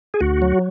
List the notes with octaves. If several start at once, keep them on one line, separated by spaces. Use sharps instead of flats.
G#4
D2 F#4
F#3